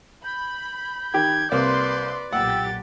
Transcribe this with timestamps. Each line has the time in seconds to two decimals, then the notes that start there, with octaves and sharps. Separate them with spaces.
0.24 B5 G6
1.14 D#3 G4 G5 G#6
1.52 C2 A#3 B4 D5 C6
2.33 B1 A#2 G4 F#5 E6 A6